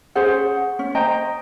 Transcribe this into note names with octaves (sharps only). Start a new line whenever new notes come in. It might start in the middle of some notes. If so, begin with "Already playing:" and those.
C#4 G#4 C5 F#5
C#4
C5 D#5 G5 A#5